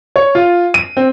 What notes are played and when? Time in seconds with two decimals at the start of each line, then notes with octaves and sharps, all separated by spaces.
0.16 C#5
0.35 F4
0.74 D#7
0.97 C4